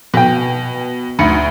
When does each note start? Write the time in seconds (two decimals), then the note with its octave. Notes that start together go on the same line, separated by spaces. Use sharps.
0.14 B2 B4 G5
1.19 D2 D#4 B5 C#7